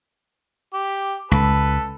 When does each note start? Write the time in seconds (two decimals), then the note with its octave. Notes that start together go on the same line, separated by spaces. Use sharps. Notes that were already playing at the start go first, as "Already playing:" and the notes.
0.74 G4
1.31 C#2 A4 B4